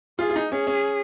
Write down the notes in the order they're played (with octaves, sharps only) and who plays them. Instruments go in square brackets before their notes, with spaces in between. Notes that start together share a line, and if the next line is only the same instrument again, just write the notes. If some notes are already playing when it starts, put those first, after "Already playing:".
[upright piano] F4 [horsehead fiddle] G#4
[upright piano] F4
D#4
[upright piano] C#4 [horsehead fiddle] G#4
[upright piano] C#4